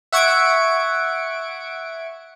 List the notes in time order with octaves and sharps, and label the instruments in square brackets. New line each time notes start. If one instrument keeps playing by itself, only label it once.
[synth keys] E5 F#5 C#6 G#6 C#7 D7